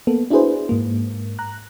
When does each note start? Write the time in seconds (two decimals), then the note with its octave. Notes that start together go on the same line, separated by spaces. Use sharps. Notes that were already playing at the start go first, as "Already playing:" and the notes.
0.07 A#3 B3 A4
0.30 D4 E4 F#4 G#4 B4 C5
0.69 G#2 A#3
1.39 A#5 F#6